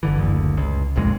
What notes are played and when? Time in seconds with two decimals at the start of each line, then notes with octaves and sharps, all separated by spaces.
0.03 G1 D3 E3
0.18 F#1 D2
0.57 C#2
0.96 E1 A#1 F2 G#3